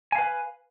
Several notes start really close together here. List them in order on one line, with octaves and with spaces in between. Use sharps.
G#5 F5 B4